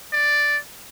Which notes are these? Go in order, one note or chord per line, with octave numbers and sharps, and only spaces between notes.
D5